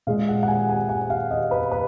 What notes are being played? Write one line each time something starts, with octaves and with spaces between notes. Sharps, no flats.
A#2 G#3 F5
F#5
F#5
G#5
G#5
F#5
F5
D#5
B4
B4